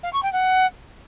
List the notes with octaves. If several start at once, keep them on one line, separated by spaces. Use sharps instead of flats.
F5
C#6
G5
F#5